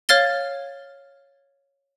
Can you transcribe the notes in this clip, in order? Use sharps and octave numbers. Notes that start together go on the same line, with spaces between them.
C#5 F5 F6 A6 G7